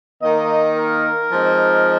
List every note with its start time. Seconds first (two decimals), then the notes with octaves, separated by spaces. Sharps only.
0.22 D#3 A#3 D#4 D#5
0.77 A#4
1.31 F3 G#3 C4 D#4